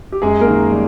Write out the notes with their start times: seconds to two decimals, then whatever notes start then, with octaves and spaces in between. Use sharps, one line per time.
0.12 G4
0.22 F#2 G#3 G#4
0.41 A#3 A#4
0.47 D#3
0.72 G3